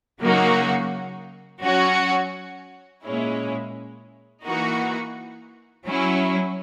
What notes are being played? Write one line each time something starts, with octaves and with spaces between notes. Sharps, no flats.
C#3 F#3 A#3 D#4 F#4
F#3 C#4 F#4
A#2 G#3 C#4 E4
E3 A#3 D#4 F#4
F#3 C#4 E4